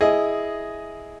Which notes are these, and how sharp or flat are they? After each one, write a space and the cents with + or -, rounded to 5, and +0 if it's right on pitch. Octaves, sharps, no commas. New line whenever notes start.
E4 +0 G#4 +5 D#5 +0